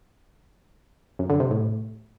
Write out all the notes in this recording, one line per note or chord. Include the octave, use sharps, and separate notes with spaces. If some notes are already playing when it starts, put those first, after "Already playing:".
F#2
D3
C3
A2